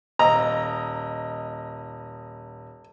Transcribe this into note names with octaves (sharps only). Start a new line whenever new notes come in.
D#1 D#5 A#5